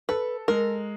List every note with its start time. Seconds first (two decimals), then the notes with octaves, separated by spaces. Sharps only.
0.09 A4 B4
0.48 G#3 A#4